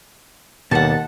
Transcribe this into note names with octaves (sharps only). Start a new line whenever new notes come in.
D#2 B2 G3 A4 F#5 A5